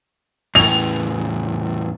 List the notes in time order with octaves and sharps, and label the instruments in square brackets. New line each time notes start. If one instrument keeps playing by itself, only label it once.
[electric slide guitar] E2 A2 [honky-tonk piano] F7